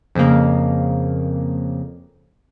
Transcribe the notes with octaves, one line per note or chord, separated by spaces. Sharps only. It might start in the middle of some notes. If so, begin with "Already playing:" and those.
F2 C#3 A#3